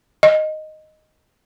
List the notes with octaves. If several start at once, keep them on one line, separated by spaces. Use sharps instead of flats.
D#5